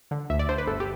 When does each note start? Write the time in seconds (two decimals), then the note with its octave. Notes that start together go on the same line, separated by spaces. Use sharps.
0.11 D3
0.30 D2 E5
0.39 D5
0.49 D3 C5
0.58 B4
0.67 G1 A4
0.80 G4